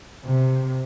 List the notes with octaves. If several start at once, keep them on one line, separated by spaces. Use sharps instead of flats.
C3